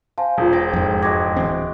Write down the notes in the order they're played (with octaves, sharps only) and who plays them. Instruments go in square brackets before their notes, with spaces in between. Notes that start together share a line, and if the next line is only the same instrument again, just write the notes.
[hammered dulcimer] C5 [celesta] F5 G#5 A5
[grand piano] E1 [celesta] F4 G#4
[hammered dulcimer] G5 D6 [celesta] A#6
[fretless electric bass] F2 G#2
[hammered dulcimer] G#3 F#4 G4 [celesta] D6 G#6 A#6
[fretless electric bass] D1 E3 C4